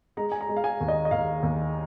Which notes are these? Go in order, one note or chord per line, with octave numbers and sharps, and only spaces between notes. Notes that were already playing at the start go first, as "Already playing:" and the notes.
G#3 A#5
G#5
A#5
G#3
F5
G#5
D#2
D#5
D#5
D#2 F5
D#2